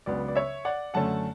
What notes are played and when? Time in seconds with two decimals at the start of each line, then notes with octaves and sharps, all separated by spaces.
0.06 C#2 C#3 F#3 B3 D4 D5
0.28 D5
0.36 C#5 E5
0.65 D5 F#5
0.94 F#2 D3 A3 C#4 F#5 A5